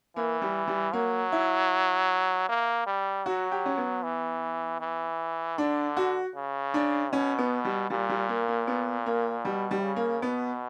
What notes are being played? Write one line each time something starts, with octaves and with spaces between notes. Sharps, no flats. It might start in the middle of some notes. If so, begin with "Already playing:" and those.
E3 A#3
G3
G3
F#3 A#3
E4
A#3
G3
F#3 F#4
G4
C#4
B3
E3
E3
D3 D4
F#4
C#3
D4
B2 C#4
B3
G3
A#2 G3
G3
A#3
A#3
B3
A#3
B2 G3
G3
C#3
A#3
B2 B3